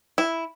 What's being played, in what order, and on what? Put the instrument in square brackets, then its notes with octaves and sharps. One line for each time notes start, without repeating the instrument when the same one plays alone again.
[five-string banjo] E4